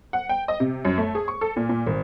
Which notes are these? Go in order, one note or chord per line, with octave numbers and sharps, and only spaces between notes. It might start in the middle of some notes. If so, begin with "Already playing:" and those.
F#5
G5
D#5
C3
F#2
A3
G#4
C#6
A4
A#2
A#2
G#1